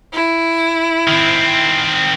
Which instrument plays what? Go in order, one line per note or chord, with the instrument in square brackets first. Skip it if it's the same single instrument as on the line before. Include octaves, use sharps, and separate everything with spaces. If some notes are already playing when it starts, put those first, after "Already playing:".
[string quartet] E4
[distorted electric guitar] D#3 C4